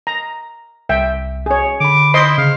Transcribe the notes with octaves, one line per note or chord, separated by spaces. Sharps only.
A#5
C2 E5 G5
G#4 C#5
D3 B5 D6
E4 C5 D#5 C6
C#3 F5